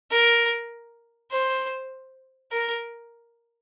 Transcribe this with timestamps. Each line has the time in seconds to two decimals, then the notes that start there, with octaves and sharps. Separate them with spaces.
0.10 A#4
1.30 C5
2.51 A#4